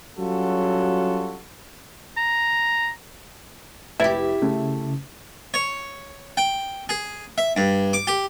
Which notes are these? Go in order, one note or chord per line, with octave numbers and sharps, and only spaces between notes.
F#3 G3 C#4 F4 F#4 A4
A#5
F1 E4 G4 B4 E5 A6
C#3 A3
C#5
G5
G#4
E5
G2
D6
G4